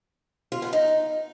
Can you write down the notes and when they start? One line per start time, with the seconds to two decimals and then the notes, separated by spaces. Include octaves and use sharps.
0.52 F4
0.62 B3
0.73 D#4